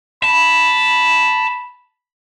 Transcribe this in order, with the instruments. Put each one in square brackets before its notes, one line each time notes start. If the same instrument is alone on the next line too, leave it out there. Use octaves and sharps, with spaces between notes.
[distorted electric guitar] A5 [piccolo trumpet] B5